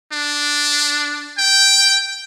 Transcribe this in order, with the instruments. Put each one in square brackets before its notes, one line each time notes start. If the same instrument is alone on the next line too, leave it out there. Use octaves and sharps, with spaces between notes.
[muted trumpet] D4
G5